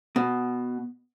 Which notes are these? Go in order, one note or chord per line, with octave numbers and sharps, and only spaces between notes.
B2